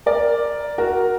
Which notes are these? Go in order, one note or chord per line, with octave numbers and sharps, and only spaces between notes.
A#4 D5
F#4 A#4